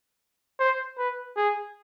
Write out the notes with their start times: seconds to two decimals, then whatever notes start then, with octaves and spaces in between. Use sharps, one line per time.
0.60 C5
0.98 B4
1.37 G#4